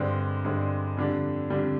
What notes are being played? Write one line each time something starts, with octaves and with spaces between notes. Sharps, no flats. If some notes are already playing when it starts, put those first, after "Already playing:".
Already playing: G2 D3 G#3 C4
G2 D3 G#3 C4
F2 D3 G3 D4
F2 D3 G3 D4